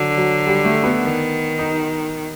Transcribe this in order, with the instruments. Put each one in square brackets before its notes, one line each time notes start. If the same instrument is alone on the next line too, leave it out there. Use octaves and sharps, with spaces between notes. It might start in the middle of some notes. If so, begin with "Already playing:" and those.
Already playing: [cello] D3 [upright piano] F#3
[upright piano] F#3
G3
A3
B3
[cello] D#3
[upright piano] D#4